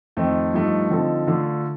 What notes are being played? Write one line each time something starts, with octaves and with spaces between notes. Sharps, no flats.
F2 D#3 A3 C4 D#4
G2 F3 A3 D#4
D3 F3 C4 D#4 A4
D3 A3 D4 F4